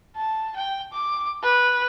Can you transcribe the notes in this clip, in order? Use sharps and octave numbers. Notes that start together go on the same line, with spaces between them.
A5
G5
D6
B4